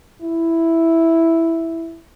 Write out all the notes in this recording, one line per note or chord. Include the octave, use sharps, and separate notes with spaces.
E4